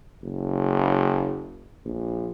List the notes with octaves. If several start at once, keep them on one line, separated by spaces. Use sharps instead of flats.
F#1
A#1